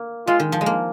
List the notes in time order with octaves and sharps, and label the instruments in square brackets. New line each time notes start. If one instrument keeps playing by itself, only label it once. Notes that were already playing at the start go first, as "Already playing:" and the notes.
Already playing: [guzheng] A#3
[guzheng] G#3 [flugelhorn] F4
[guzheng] D#3
F3
G#3
A#3